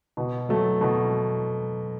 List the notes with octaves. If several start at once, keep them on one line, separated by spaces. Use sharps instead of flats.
B2
F#3 A3
B2